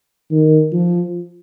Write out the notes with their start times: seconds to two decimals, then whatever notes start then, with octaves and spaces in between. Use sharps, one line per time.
0.31 D#3
0.72 F3